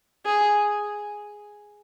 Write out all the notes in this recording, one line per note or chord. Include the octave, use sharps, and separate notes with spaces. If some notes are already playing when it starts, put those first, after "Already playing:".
G#4